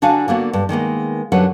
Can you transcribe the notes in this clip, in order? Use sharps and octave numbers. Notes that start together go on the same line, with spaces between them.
D3 D4 F#4 F5 G#5
D3 A#3 B3 F#4
G2
D#3 G#3 A#3 B3
F#2 D3 F#3 G3 B4 F#5